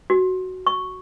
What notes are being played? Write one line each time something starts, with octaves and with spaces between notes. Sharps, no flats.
F#4
C#6